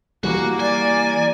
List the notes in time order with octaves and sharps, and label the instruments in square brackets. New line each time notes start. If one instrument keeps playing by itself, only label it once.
[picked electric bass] E3 G3 [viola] A#3 D6 [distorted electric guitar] F#4
[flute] D5 [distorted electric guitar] G#5